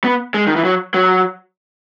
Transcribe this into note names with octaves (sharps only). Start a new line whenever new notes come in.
B3
G#3
D#3
E3
F#3
F#3